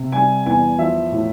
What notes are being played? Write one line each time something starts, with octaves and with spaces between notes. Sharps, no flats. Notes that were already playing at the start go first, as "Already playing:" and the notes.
Already playing: C3
G3 G#5
E2 G#5
F3 E5
A2